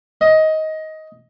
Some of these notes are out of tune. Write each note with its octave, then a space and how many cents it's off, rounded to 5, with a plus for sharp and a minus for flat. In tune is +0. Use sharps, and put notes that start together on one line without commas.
D#5 +15